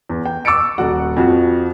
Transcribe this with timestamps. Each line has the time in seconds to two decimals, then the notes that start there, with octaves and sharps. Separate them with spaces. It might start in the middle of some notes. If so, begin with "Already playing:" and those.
0.10 E2
0.25 G5
0.45 C#6 D6 E6 A6 C#7 D7
0.78 D#1 F#4 F#5
1.16 F2 F3 F#4